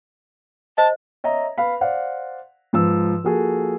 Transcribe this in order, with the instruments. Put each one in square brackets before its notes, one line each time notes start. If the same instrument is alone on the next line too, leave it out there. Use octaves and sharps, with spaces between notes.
[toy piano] C5 D#5 [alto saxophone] A5
[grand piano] C#5 D#5 E5 A#5
B4 F5 B5
C5 D5 F5 F#5
G#2 F3 B4 E6
F3 A#3 F#4 G#4 A4